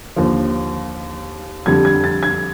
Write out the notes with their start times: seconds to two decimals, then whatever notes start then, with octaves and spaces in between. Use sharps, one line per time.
0.16 D#2 D3 F3
1.66 F2 D3 G3 G#6
1.85 G#6
2.04 A6
2.23 G#6